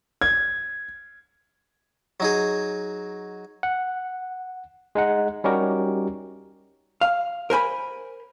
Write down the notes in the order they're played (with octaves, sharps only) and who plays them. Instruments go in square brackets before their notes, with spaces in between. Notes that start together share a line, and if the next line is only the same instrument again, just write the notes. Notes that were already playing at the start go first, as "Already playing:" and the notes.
[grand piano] G#6
[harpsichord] F#3 D#4 G#4
[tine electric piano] F#5
G#3 D#4 F#5
G3 C#4 D#4 F#4 G4 A#4
[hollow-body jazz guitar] F5
A#4 C5 G#5 B5